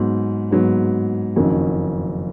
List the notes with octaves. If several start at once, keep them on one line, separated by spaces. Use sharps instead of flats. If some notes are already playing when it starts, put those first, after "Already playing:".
Already playing: G#2 F#3 B3
G#2 F#3 B3
F#1 F2 D#3 F#3 C#4